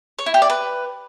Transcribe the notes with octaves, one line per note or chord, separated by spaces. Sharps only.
C#5
E4
G4
D5
B4